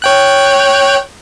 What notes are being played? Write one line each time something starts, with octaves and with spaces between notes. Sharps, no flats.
C#5 G5 F#6